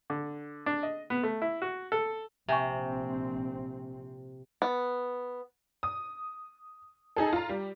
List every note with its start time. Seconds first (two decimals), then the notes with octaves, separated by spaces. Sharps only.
0.10 D3
0.66 D4
0.83 D#5
1.10 B3
1.23 A3
1.42 E4
1.62 F#4
1.92 A4
2.49 A#1 C3 C4 E5 G#5 C#6
4.62 B3
5.83 D#6
7.16 D#4 G#4 A4
7.33 F4 A#5
7.49 G3